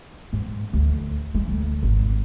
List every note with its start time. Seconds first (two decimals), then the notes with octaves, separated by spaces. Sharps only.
0.33 G#2
0.73 D2
1.35 G#3
1.48 D2
1.83 G#1